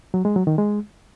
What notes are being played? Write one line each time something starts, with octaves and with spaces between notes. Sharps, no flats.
F#3
G#3
F#3
D#3
G#3